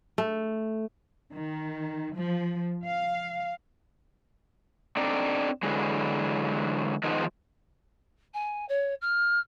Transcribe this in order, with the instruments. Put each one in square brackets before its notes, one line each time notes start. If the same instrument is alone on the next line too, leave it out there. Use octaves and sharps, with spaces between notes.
[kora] A3
[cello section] D#3
F3
F5
[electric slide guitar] C4 D4 D#4 A4 D5
D3 E3 F#3 G#3
D#3 F3 G#3 B3 D#4
[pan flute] G#5
C#5
F6